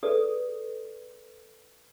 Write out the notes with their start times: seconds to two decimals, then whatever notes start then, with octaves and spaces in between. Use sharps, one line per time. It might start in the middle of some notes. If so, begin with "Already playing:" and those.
0.03 G#4 A4 B4 D5 D#6